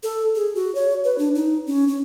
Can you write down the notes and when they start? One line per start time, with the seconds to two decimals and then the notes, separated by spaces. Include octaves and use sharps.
0.03 A4
0.35 G#4
0.55 F#4
0.75 C#5
1.04 B4
1.18 D4
1.35 D#4
1.67 C#4
1.88 C#4